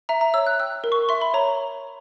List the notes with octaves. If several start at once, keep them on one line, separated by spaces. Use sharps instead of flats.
E5 A#5
A#5
C#5 E6
F#6
G5 E6
A#4
C#6
E5 C6
B5
C#5 A#5